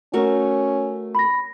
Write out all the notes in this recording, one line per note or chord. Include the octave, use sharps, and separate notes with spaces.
A3 C#4 F#4 A#4
B5 A#6